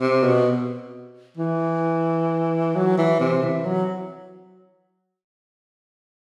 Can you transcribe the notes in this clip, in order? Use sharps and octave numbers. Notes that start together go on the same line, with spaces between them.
C3
B2
E3
F#3
E3
C3
E3
F#3